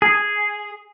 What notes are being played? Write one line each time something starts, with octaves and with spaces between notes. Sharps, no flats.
G#4